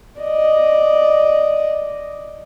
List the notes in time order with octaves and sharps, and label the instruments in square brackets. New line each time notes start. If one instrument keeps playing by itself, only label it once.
[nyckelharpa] D5 D#5